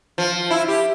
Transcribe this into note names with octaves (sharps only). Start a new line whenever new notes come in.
F3
E4
G4